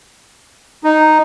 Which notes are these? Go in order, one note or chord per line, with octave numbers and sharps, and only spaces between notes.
D#4